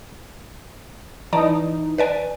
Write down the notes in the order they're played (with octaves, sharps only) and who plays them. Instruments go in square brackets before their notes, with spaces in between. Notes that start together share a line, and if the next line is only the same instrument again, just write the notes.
[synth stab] E3 D#4 [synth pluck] D5 A5 A#5
[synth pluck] B4 D5 G#5